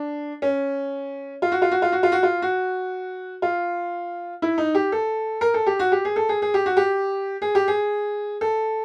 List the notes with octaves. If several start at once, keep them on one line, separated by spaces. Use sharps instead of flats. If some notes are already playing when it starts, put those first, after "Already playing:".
Already playing: D4
C#4
F4
F#4
F4
F#4
F4
F#4
F4
F#4
F4
F#4
F4
E4
D#4
G4
A4
A#4
A4
G4
F#4
G4
G#4
A4
G#4
G#4
G4
F#4
G4
G#4
G4
G#4
A4